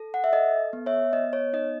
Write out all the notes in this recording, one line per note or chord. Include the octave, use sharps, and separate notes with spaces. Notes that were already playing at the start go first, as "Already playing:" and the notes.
Already playing: A4
F#5
E5
A4 D#5
B3
C#5 E5
B3 D#5
C#5
D#4 D#5